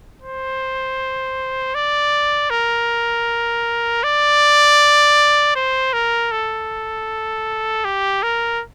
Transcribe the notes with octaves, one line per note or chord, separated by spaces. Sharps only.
C5
D5
A#4
D5
C5
A#4
A4
G4
A#4